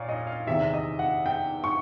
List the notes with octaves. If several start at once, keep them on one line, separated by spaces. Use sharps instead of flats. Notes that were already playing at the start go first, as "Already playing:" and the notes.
Already playing: A#2 C#5 D5 F5
D#5
F5
E2 C3 D#3 E5
D#5
F#5
G5
C#6